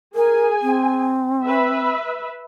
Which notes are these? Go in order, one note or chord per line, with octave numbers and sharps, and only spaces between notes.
G#4 A#4 G#5
C4
B4 E5